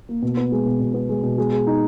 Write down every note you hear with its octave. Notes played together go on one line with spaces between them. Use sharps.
A#3
B2
B3
G#3
B2
B2
B3
G#3
B2
G#3
G#4
D#4